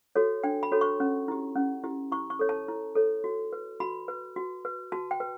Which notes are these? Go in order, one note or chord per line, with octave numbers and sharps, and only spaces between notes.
F#4 A4 C#5
D4 G5
B5
F#4 A4 C#5
C#6
C#4
E4 G4
C#4
E4 G4
E4 C#6
C#6
A4 C#5
A5
E4
A4 C#5
F#4
B4
F#4 B5
B4
F#4
B4
F#4 A5
G5
B4